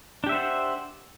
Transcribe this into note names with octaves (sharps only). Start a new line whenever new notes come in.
D4 G4 C5 E5 F#5